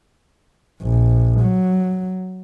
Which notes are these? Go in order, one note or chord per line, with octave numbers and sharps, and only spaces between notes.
A#1
F#3